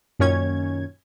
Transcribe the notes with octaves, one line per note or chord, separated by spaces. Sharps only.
F#2 A#2 D#3 C#4 C#5 G#6